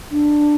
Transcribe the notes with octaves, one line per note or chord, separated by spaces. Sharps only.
D4